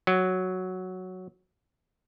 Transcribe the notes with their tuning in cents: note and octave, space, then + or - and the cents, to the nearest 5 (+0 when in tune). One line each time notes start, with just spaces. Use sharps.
F#3 +0